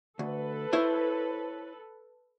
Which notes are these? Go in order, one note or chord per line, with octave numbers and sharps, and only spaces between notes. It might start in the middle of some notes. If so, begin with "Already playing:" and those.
D2 A4 B4
E4 C5 C#5